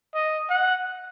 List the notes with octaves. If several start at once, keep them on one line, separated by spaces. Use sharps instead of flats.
D#5
F#5